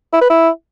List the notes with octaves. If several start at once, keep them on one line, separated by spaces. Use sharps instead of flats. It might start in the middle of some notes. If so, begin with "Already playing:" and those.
E4
B4
E4